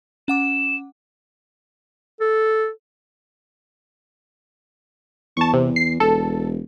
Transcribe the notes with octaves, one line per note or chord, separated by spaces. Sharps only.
C#4 F#5 D6 E7
A4
E2 A5 C#6
C3
C7
E1 A4